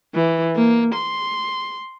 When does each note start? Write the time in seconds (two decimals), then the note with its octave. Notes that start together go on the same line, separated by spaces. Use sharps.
0.15 E3
0.56 A#3
0.95 C6